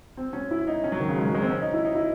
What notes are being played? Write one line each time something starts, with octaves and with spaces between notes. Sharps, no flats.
C4
C#4
E4
D#4
C#4
F#3
D#3
C#3
G#3
F#3
G#3
C4
C#4
D#4
E4
D#4
E4